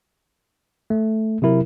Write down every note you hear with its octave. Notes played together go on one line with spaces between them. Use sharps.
A3
C3 F#3 E4 A#4